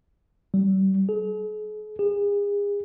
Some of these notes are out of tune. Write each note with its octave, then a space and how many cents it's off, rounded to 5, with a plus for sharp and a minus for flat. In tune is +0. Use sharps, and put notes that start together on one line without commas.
G3 -35
G#4 +45
G#4 -35